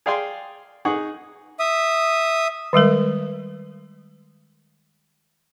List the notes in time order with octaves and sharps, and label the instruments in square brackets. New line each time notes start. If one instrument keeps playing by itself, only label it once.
[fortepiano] G#4 D5 F5 G5 G#5 C6
D#4 G#4 F#5 C#6
[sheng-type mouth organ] E5 D#6
[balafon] D#3 G3 G#3 A#4